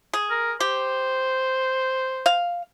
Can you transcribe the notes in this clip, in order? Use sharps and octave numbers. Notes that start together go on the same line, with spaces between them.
G#4
A#4
G4 C5
F5